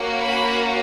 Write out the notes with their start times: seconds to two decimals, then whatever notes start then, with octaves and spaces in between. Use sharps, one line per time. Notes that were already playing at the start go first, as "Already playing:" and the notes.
Already playing: A#3 C#4 F#4
0.24 B5